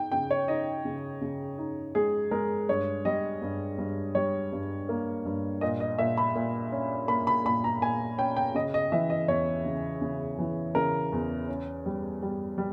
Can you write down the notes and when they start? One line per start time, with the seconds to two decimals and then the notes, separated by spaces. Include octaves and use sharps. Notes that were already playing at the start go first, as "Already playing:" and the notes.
Already playing: D#4 G5
0.12 C#3 G5
0.31 C#5
0.48 D#4 D#5
0.85 C#3
1.21 C#3
1.58 D#4
1.95 G#3 G#4
2.31 G#3 A#4
2.69 G2 C#5
3.05 G3 D#5
3.42 G2
3.78 G2
4.15 G3 C#5
4.52 G2
4.89 A#3
5.25 G2
5.61 A#2 D#5
5.80 D#5
5.99 A#2 E5
6.18 B5
6.35 A#2
6.72 C#4
7.08 A#3 B5
7.27 B5
7.45 A#2 B5
7.64 A#5
7.82 A#2 G#5
8.18 C#4 G5
8.36 G5
8.55 C#3 D#5
8.74 D#5
8.92 E3 E5
9.10 D#5
9.28 E2 C#5
9.65 C#3
10.01 C#3
10.38 E3
10.75 C#3 A#4
11.12 E2
11.48 C#4
11.86 G3
12.22 G3
12.58 G3